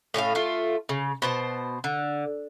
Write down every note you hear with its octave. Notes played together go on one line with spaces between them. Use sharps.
A2 C#4 F4 F5
A3 F4
C#3
B2 C5 A5
D3